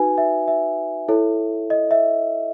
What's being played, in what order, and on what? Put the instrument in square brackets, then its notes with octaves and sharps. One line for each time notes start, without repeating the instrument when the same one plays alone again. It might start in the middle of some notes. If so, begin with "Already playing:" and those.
Already playing: [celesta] D#4 F#4 B4 G#5
E5
E5
E4 A4 C#5
D#5
E5